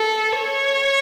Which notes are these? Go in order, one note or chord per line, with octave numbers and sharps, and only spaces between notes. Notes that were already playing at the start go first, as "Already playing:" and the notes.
Already playing: A4
C#5